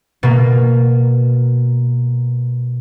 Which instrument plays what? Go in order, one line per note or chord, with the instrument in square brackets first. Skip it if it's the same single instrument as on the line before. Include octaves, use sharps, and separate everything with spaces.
[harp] B2 A#3